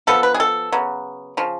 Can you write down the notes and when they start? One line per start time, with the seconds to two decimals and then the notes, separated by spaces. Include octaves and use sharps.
0.07 F3 B3 A4
0.23 B4
0.34 G#4
0.40 A4
0.72 C#3 F#3 B3
1.37 C#3 F3